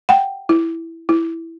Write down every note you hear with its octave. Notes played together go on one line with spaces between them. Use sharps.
F#5 G5
E4
E4